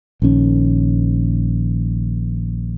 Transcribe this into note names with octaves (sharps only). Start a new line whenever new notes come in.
A#1 D#3 C#4